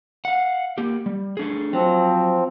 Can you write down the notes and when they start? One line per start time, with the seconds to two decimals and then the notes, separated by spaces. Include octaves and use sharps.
0.25 F5 F#5
0.78 A#3 G4
1.06 G3
1.37 A3 D4 G#4
1.73 F3 F#3 C4